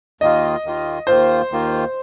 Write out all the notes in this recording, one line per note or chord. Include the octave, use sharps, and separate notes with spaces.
D#2 D#3 A#3 F4 D#5
D#2 D#3 A#3 F4
D#2 D#3 A#3 F4 C5
D#2 D#3 A#3 F4